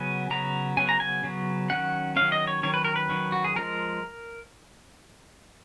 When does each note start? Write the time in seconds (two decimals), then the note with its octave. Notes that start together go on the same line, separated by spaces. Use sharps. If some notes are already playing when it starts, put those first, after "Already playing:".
Already playing: C#3 F#3 B3 G#5
0.30 C#3 F#3 B3 A#5
0.77 C#3 F#3 B3 G#5
0.89 A#5
1.00 G#5
1.24 C#3 F#3 B3
1.70 D#3 F#3 C#4 F#5
2.16 D#3 F#3 C#4 F5
2.32 D#5
2.47 C#5
2.63 D#3 F#3 C#4 C#5
2.74 B4
2.84 A#4
2.96 B4
3.09 D#3 F#3 C#4
3.32 F#4
3.44 G#4
3.56 F3 G#3 A#4